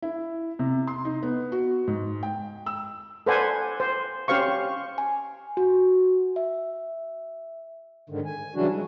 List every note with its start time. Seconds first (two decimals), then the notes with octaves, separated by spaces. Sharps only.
0.02 E4
0.59 C3
0.87 C6
1.05 D#4
1.22 B3
1.52 F#4
1.87 G#2
2.23 G5
2.66 E6
3.26 A4 B4 C5 D5 F#5 G#5
3.80 C5
4.28 C#4 G4 C5 F5 C#6
4.98 G#5
5.57 F#4
6.36 E5
8.10 G#2 D3 D#3
8.25 G#5
8.55 C#3 E3 F#3 G3 D4 F#4
8.73 F#3 G#3